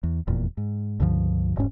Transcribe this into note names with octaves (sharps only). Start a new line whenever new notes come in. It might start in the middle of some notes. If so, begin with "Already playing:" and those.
E2
F1 E2 A#2
G#2
C#2 G2 D3 F3
E1 G#2 C#4